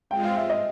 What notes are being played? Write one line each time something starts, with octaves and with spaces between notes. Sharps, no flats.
G#3 C4 F4 G5
F5
E5
D#5